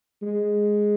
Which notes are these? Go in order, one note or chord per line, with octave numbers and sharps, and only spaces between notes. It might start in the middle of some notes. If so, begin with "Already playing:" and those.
G#3